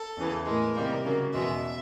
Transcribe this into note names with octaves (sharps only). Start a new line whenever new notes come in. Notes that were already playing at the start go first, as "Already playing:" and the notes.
Already playing: A4
E2 C#3 E3
A2 E3 G#3 A#4
C3 D#3 G3 A#3
C#3 F#3 A#3
E2 B2 G#3 E5